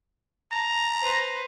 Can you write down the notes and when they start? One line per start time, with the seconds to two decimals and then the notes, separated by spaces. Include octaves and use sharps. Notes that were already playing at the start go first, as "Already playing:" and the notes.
0.52 A5 A#5
1.02 B4 C5